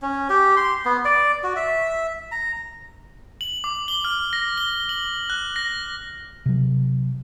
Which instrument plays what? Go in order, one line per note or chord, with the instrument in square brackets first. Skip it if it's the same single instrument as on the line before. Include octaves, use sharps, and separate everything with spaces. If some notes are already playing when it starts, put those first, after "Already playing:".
[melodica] C#4
G4
C6
B3
D5
F#4
E5
A#5
[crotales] F#7
D6
G7
F6
A#6
G7
F#7
F#6
A#6
[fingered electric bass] C3 F#3